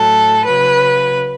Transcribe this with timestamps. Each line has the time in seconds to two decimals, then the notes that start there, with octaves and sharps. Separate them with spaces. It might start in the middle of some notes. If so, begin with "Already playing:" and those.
Already playing: A2 F#3 A4
0.46 C#3 F#3 B4